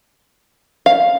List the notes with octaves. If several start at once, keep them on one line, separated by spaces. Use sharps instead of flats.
F5